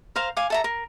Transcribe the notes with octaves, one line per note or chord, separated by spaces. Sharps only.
A#4 C5 F5
F5 G#5 D6
A4 E5 A#5
A#4